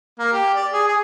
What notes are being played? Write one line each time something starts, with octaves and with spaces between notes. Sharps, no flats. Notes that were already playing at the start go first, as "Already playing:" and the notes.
A#3
G4
D5
G#4
G#4